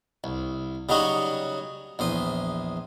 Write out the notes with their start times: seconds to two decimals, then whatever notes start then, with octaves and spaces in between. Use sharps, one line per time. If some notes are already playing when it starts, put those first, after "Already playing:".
0.24 C2
0.89 C#3 F#3 G3 C#4 D#4 F#4
1.99 A#1 E2 C5 D#6